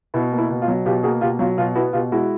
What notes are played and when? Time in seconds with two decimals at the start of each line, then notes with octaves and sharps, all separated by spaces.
0.14 B2 E4
0.32 A#3
0.38 E4
0.50 B2
0.62 F4
0.68 F#3
0.86 B2 F4 G4
1.03 A#3 F#4 G#4
1.21 B2 F4 G4
1.39 F#3 F4
1.58 B2 F4
1.75 B3 E4 F#4
1.93 B2 F4 G4
2.12 G#3 E4 F#4